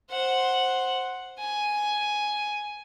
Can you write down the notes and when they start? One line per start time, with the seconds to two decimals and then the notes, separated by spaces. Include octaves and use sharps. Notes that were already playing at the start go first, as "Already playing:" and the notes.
0.11 C5 F#5
1.40 G#5